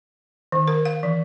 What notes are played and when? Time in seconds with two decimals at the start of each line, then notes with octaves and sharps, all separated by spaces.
0.52 D#3
0.68 A#4
0.85 F5
1.03 E3